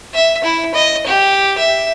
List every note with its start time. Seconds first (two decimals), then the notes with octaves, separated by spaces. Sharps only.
0.14 E5
0.44 E4
0.75 D#5
1.07 G4
1.58 E5